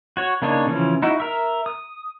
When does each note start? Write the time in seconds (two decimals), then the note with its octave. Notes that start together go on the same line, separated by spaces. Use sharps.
0.17 F#4 C#5
0.42 C#3 A#3 D4 D#4 C#5
0.67 C#3 E3 F3 C#4
1.02 D#4 E4 F#4
1.20 A#4 E5
1.66 D#6